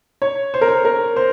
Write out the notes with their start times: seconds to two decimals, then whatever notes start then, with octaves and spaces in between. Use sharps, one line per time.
0.22 C#5
0.54 C5
0.61 A#4
0.69 C5
0.85 A#4
1.16 C5